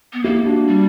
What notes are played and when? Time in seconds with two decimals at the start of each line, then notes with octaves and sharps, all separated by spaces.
0.13 B3
0.24 A#3 E4 G4
0.46 D4 F#4
0.67 G3